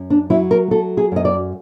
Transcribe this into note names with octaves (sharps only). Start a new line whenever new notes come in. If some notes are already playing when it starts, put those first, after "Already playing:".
Already playing: F#2
D4
F#3 E4
A#4
F#3 A4
G#4
F#2 D#5
D5